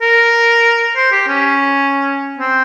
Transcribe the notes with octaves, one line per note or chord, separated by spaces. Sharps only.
A#4
C5
G4
C#4
C4